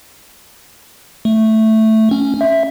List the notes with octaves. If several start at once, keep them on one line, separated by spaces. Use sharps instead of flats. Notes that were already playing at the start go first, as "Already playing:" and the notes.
A3
C#4
E5